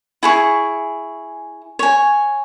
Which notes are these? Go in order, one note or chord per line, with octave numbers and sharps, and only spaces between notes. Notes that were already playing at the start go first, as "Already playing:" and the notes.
E4 G#4 C#6
C#5 G#5